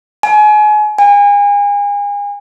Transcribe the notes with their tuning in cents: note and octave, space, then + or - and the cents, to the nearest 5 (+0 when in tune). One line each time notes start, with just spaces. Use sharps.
G#5 +30
G#5 -35